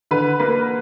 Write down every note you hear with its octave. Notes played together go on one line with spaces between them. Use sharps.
D3 B4
A#3 B4